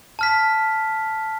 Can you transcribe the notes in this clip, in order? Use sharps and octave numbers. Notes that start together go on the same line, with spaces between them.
A5 F6 B6